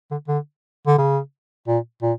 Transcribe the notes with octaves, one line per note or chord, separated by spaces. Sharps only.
D3
D3
D3
C#3
A#2
A#2